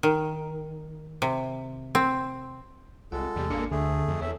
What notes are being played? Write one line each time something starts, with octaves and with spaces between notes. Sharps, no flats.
D#3
C3
C4
C2 G#3 F4 A4 F#5
E2 C3 G3
G#1 A#3 D4 C#7
D2 D3 A3 G#4
F2
E2 A4 C#5 E5